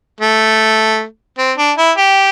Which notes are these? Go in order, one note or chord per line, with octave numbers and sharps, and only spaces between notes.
A3
C4
D4
E4
G4